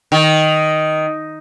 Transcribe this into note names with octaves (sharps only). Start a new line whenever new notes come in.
D#3